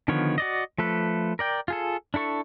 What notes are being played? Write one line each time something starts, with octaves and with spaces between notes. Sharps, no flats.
D3 D#3 F3 B3 C#5
F#4 D5 D#5
F3 A3 A4 B4
A#4 D5 G5
F4 G#4 A4
D4 E4 A4 C#6